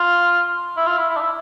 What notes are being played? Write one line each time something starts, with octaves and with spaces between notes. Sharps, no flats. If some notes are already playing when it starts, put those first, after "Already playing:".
Already playing: F4
E4
F4
E4
E4
D4
E4